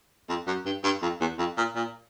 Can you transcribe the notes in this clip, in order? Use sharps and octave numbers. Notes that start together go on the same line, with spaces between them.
F2
F#2
G2
G2
F2
E2
F2
A#2
A#2